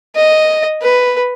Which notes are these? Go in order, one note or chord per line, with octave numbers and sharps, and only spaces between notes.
D#5
B4